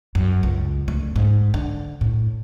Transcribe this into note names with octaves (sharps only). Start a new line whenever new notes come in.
F#2
C#2
D2
G#2
D3
A2